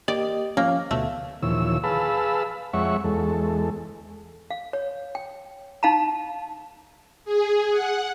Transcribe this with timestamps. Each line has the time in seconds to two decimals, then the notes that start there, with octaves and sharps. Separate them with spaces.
0.08 A#3 G4 D5 D#5
0.57 F3 A#3 C#4
0.91 D2 B2 D3 A3
1.43 D#2 A#2 E3 F3 C#5 E6
1.83 G#4 B4 F5 A5 B5 E6
2.73 F2 G#3 C#5 E5 F#5 C#6
3.04 E2 G#3 A4
4.50 F5
4.73 C#5
5.15 G5
5.83 D#4 F5 A5 A#5
7.25 G#4
7.71 F#5